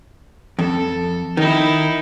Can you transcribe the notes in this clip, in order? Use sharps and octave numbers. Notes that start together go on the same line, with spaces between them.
F2 A4
D#3 D#4 E4